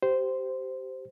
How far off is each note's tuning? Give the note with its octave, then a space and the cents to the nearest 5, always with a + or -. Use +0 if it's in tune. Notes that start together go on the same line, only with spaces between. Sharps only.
G4 -20 C5 -10